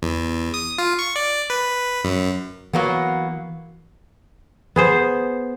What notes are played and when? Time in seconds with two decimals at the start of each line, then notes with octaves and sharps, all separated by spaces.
0.02 E2
0.54 D#6
0.78 F4
0.99 C#6
1.16 D5
1.50 B4
2.04 F#2
2.73 E3 F#3 A#3 B3
4.76 B3 G#4 C5